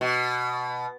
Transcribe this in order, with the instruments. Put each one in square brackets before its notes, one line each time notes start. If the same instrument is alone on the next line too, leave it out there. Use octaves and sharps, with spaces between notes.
[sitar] B2